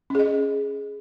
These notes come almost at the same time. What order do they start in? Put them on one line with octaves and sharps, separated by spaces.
C#4 G#4 D#5